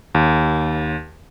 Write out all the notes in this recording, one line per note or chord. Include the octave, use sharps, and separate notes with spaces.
D#2